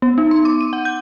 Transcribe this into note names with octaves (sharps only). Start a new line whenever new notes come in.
B3
D#4
C6
D6
D#7
F#5
G6